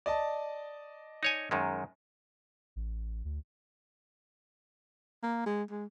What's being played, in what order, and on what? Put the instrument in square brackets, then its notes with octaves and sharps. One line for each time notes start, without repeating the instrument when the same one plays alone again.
[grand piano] D5 D#5 A5
[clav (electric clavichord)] D#4 C#5 G#5
F#2 D#3 G#3
[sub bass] A1
D2
[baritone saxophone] A#3
G#3
G#3